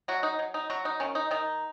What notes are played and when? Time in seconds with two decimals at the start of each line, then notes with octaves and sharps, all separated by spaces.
0.08 F#3 F#4
0.23 D#4
0.39 F#3
0.54 D#4
0.70 F#3 F#4
0.85 D#4
1.00 D#3 C#4
1.15 D#4
1.31 D#3 D#4